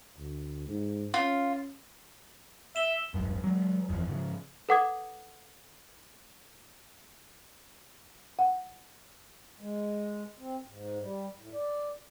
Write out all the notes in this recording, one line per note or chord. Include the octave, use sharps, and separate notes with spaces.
D2
G#2
C#4 F4
E5 E7 G7
D#1 G#1 F#2
F#3 G#3
F#1 E2 F3
G#2 C#3 F3
A4 B4 F#5 D6 D#6 G#6
F#5
G#3
C4
G#2
G3
A2
D5